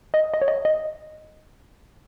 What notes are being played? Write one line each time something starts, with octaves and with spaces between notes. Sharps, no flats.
D#5
D#5
C#5
D#5
D#5